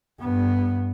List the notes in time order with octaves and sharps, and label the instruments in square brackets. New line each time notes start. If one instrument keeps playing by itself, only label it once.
[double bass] G2 B3